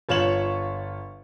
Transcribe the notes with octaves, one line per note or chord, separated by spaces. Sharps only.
G1 F4 C#5 E7 F#7